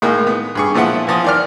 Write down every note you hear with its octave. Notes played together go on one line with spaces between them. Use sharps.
A2 D#3 G#3 A#3
B3
G2 G#4 C#6
A#2 F3 B3 E4 F#5
E3 F3 D#6
D#3 D5 F6